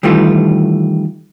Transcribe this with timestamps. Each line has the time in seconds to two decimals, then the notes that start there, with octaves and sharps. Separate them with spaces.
0.03 D#3 E3 G3 A3 F4